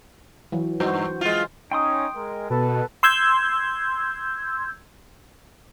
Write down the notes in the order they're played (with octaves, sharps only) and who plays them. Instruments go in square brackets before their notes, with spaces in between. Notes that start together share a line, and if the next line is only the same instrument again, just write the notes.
[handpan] E3 F#3
[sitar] G2 [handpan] F#4 C5
[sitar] G#3 F4
[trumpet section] C#4 D#4 [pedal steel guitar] G5 C6 D#6
[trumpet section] G#3 A#4
[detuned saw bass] B2 [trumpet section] A4 B4
[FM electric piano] C6 E6 G6 G#6